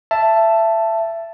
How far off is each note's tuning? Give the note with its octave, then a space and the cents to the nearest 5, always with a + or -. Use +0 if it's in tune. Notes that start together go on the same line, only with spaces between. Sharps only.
E5 +20 A5 +0